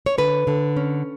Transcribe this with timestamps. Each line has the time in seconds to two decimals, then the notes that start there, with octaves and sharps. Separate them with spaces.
0.06 C#5
0.18 D3 B4
0.47 D3
0.77 C#4